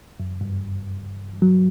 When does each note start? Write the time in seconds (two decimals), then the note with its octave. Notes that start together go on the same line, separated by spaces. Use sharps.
0.20 F#2
0.41 G2
1.42 F#3